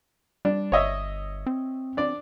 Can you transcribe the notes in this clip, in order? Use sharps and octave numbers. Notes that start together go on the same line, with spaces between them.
G3 D4
G1 C#5 D#5 E5
C4
D4 D5